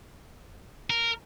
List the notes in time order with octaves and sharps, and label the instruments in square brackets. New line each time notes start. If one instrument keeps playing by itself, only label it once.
[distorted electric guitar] A#4